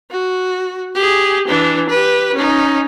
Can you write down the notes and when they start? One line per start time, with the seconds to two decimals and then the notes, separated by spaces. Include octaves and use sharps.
0.11 F#4
0.95 G4 G#4
1.48 E3 D4
1.89 G4 B4
2.34 C#4 D#4